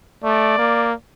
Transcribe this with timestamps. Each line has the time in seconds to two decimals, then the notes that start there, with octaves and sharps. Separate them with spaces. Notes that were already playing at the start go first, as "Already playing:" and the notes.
0.23 A3 D5
0.58 A#3